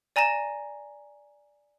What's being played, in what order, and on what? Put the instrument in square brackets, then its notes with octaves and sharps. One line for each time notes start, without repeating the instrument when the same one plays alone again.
[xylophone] D5 G#5 A#5 A#6 E7